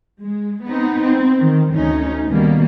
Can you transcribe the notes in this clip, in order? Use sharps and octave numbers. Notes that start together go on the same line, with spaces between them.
G#3
B3 C4 D#4
C4
D#3
D2 C#4 D#4
B2 D#3 G3 A#3